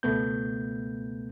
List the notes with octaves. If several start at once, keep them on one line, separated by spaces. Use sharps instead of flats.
C#2 B2 A3 B3 G6